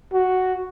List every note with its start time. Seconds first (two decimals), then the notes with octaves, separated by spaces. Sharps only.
0.13 F#4